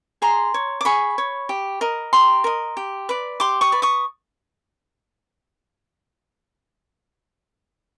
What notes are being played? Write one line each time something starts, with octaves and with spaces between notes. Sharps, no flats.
G#4 A#5 C6
C#5
D6
G#4 B5 C#6
C#5
G4
A#4 D#5
G4 A#5 C6
A#4 D#5
G4
B4 D5
G4 C6 D6
C#6 D#6
B4 D5
C#6 D#6